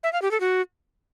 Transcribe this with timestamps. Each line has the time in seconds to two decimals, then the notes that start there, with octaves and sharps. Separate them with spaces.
0.03 E5
0.13 F5
0.22 G4
0.31 A4
0.40 F#4